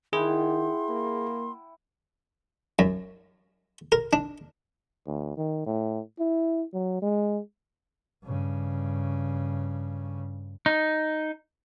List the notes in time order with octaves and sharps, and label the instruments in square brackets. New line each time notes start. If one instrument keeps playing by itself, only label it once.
[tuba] D#3 [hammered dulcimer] E4 F#5 G5 [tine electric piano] G#4 [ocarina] C6
[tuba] A#3
[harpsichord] F#2
A#4
D4
[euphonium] D2
D#3
A2
E4
F#3
G#3
[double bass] G2 C#3
[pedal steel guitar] D#4